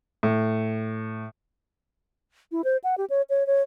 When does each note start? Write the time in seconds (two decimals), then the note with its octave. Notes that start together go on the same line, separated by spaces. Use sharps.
0.23 A2
2.52 E4
2.64 C5
2.84 F#5
2.98 G4
3.10 C#5
3.30 C#5
3.47 C#5